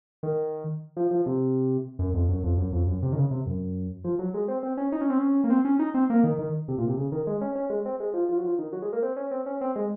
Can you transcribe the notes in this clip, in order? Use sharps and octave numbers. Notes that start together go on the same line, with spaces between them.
D#3
F3
F3
C3
F#2
F2
F#2
F2
F#2
F2
F#2
C3
D#3
C#3
C3
F#2
F3
F#3
G#3
C4
C4
C#4
D#4
C#4
C4
C#4
A#3
C4
C#4
D#4
C4
A#3
D#3
D#3
C3
A#2
C3
C#3
D#3
G#3
C#4
C#4
G#3
C4
G#3
F3
F3
F#3
F3
D#3
F#3
G#3
A#3
C4
C#4
C4
C#4
C4
G#3